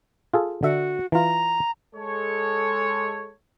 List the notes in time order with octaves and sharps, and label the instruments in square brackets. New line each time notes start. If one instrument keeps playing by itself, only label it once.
[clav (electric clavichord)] F4 G#4 A4
[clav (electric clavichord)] D3 E5 [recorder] F#4
[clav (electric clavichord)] E3 F4 [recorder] A#5
[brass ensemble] G#3 A4 C#5